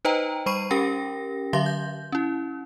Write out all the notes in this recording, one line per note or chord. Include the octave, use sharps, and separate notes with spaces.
D#4 B4 C5 D#5 G5 A#5
G3 C5 B5 C#6 C7 D#7
C#4 G4 A#4 G5 A#6
D3 F#3 E5 F5 C6 A#6
G6
C#4 E4